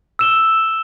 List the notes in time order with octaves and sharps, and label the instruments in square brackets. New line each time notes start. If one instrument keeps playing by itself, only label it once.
[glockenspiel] E6 E7 G7